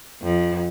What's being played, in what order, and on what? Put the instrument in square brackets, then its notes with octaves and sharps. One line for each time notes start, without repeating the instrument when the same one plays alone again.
[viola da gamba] F2